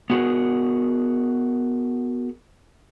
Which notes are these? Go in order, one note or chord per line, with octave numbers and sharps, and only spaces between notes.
B3 F#4 G#4 A#4